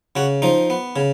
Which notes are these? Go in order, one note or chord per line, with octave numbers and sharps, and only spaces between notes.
C#3 F#4
F3 D#4
B3
C#3